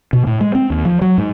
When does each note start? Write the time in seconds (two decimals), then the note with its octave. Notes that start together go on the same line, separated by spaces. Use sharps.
0.13 B2
0.27 A2
0.41 G#3
0.55 C4
0.70 D#2
0.85 F3
1.02 F#3
1.18 G#2